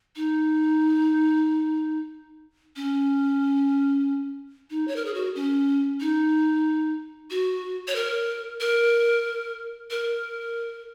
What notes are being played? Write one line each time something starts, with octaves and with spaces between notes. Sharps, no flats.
D#4
C#4
D#4
C#5
A#4
G#4
F#4
C#4
D#4
F#4
C#5
A#4
A#4
A#4